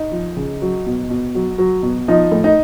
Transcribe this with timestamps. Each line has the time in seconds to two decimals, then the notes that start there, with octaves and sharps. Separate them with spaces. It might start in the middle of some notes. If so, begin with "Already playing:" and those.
Already playing: D#4
0.12 F3
0.37 C#3
0.62 F#3
0.86 B2
1.10 B2
1.35 F#3
1.58 F#3
1.83 B2
2.08 F3 D#4
2.32 A2
2.44 D#4